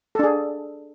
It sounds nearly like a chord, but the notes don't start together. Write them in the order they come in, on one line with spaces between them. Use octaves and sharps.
A4 D4 G#4